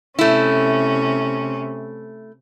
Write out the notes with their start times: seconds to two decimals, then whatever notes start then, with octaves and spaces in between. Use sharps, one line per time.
0.19 C3 A3 C#4 E4